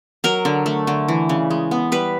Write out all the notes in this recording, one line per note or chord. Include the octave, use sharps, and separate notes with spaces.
F#3 A#4
D3
A3
D3
E3
C#3
G#3
B3
G3 B4